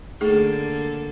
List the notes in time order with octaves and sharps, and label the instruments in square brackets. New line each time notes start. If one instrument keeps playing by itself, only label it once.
[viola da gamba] D3 A#3 A4 [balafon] A3 D#4 G#4